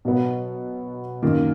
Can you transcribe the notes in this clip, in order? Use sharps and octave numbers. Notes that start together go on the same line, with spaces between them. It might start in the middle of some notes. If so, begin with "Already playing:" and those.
B2 F#3 B3
F#2 D#3 A#3 F4